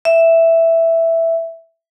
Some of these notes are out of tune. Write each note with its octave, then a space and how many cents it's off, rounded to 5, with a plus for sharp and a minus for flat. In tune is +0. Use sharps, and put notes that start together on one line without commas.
E5 +0